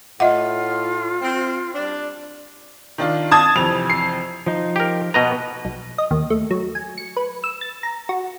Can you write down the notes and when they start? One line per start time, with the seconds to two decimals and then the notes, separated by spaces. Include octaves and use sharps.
0.20 A2 F4 D#5 E5 F#5
1.21 C4
1.75 G3 D4 D5
2.98 D#3 D4 F4
3.31 A5 D#6 G#6
3.56 F2 C3 E3 F7
3.90 C7
4.46 F3 D#4
4.76 G4 A#4
5.14 B2 B3 B4 D#5 A#5
5.65 B1
5.98 D#5
6.11 D#2
6.30 A3
6.51 F#3
6.75 G#5
6.98 C#7
7.17 B4
7.44 E6
7.61 A6
7.83 A#5
8.09 F#4